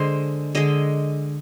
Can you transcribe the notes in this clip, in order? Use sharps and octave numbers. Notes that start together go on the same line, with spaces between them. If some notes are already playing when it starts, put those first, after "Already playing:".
Already playing: D3 G#3 C5
D3 G#3 D#5